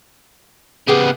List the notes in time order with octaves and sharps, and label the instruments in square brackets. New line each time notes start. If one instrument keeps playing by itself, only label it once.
[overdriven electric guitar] C#3 B3 [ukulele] G4 G#4